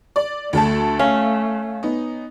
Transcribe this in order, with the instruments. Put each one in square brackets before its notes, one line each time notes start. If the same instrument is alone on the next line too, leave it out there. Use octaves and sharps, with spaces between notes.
[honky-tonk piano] D5
[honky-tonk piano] D2 A4 A5 [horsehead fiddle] A3
[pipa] C#4 [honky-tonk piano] F5
[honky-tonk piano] B3 D#4